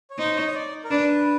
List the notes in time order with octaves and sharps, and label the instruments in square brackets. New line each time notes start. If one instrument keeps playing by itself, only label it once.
[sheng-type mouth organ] C#5
[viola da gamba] D#4 [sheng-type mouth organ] C5
[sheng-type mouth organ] C#5
D#5
D5
A#4
[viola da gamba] D4 [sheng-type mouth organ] B4